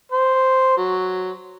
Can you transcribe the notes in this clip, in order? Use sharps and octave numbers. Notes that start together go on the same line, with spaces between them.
C5
F#3